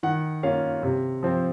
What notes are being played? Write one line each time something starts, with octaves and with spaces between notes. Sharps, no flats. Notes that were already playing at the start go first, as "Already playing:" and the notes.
D#3 F#5
A#3 C#4 F4 F5
C3
F3 C4